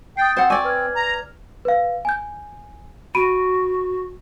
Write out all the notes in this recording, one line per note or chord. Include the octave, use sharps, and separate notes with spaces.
G5 D#6 A6 C7
C4 C5 F#5
D5 G#5 C#6 D6 E6
B4 F6 G#6
A#5
B4 F5
G#5 G6
F#4 B5 D7 D#7